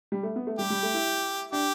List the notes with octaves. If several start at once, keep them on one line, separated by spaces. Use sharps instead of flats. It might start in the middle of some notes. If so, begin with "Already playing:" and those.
G3
A3
B3
A3
G3 G4
G3
A3
E4
D4 G4